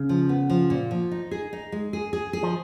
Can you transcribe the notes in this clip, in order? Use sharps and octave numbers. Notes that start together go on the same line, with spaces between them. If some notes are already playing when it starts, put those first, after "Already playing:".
Already playing: C#3
F3
B3
F3
A#2
F3
D#4
G#4
D#4
G#3
G#4
G#4
G#4
F3